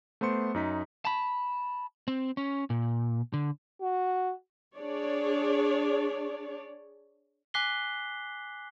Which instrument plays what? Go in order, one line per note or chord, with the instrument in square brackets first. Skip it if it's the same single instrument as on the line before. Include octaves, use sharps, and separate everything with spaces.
[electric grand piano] A3 B3 C5 C6 C#7
F#2 D#4 B6
[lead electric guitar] A5 B5
C4
C#4
A#2
D3
[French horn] F#4
[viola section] D4 G#4 C#5 D5
[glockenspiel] G#5 D6 F#6 B6 C7 G7